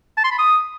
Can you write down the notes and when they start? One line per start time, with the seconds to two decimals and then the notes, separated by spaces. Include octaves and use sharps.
0.17 A5
0.24 C6
0.31 B5
0.38 D#6